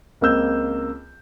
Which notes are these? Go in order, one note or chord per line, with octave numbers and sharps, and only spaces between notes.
C#2 A#3 C4 E6 G6